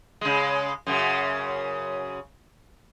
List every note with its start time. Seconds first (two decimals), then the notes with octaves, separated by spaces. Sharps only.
0.21 C#3 G#3
0.87 F#2 C#3